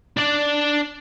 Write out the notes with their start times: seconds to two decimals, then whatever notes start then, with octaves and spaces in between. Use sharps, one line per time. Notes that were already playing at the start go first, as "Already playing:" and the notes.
0.17 D4 D5